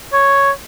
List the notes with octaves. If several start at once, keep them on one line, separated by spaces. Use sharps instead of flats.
C#5